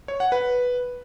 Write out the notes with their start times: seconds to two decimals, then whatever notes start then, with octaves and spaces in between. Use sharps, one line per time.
0.08 C#5
0.20 F#5
0.32 B4